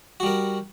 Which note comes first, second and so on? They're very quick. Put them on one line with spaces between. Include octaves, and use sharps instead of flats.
F#4 G3 A#4